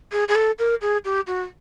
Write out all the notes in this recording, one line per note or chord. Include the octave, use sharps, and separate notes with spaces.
G#4
G#4
A4
A#4
G#4
G4
F#4